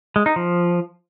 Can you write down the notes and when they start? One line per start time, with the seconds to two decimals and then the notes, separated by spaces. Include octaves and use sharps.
0.16 G#3
0.26 D#4
0.36 F3